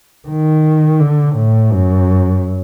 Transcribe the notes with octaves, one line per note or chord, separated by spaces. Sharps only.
D#3
D3
A2
F#2